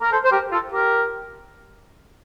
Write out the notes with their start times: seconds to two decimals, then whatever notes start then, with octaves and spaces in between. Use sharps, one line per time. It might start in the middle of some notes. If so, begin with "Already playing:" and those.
0.02 A#4
0.12 A4 C5
0.24 C5
0.32 G4 A#4
0.52 F4 A4
0.73 G4 A#4